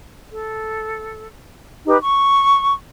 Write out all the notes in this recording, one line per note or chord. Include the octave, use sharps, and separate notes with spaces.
A4
D#4 G4 B4
C#6